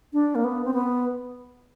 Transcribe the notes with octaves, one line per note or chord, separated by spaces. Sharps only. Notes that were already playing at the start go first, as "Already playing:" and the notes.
D4
A#3
B3
C4
B3